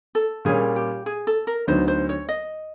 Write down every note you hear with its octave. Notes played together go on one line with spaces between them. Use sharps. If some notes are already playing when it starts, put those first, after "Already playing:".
A4
A#2 G3 A#3 C#4 G#4
G4
G#4
A4
A#4
D2 D3 F#3 B3 D#4 C5
C5
C#5
D#5